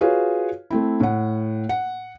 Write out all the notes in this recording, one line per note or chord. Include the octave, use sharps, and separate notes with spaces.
F4 F#4 G#4 B4 C#5 F5
A3 C4 E4
A2 F#5
F#5